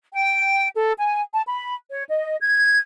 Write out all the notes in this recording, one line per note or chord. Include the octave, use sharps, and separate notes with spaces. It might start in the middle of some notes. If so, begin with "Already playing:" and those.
G5
A4
G#5
A5
B5
C#5
D#5
G#6